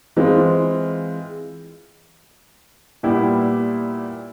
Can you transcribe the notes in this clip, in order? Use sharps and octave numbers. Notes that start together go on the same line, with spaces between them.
E3 G#3 C4 F4
A#2 G3 B3 E4 G4